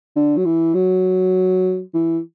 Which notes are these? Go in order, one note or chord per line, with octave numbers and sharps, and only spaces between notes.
D3
F#3
E3
F#3
E3